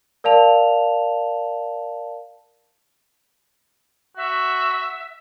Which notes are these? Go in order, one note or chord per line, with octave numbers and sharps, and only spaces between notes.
A#4 D5 F5 A5 F7
F#4 E5